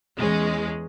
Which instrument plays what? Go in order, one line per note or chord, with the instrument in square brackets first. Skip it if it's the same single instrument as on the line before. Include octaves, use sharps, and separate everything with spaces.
[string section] E2 G#3 C#4